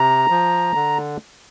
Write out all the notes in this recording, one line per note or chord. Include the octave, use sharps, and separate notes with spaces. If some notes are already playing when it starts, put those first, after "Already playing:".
Already playing: C3 A#5
F3
D3